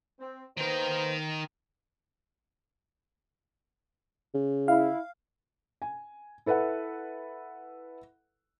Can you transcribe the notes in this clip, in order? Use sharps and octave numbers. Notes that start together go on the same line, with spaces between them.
C4
D#3 A#3 B3 A#4 C5
C#3
E4 F5
G#5
E4 A4 B4 E5 F#5